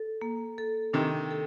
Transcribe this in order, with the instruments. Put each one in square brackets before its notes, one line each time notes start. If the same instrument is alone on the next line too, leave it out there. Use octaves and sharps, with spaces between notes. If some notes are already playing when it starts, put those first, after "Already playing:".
Already playing: [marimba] A4
A#3
A4
[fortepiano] C3 D#3 [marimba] D4
[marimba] A4